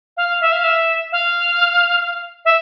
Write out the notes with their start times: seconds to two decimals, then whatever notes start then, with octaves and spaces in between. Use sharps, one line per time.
0.17 F5
0.41 E5
0.52 F5
0.64 E5
1.12 F5
2.45 E5